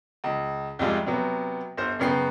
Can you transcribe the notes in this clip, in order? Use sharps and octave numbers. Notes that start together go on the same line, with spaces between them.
C#2
F2 C3 G3 G#3 F4
C3 F#3 B3
G1 C5
F#2 C#3 B3 G5 C7